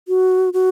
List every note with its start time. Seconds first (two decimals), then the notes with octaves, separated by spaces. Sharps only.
0.08 F#4
0.53 F#4